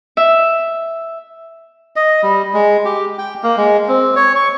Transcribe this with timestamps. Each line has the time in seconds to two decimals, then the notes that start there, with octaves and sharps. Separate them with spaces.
0.17 E5
1.96 D#5
2.23 G3
2.54 G#3
2.85 G4
3.19 G5
3.43 A#3
3.57 G#3
3.88 C4
4.16 C#5
4.36 C#6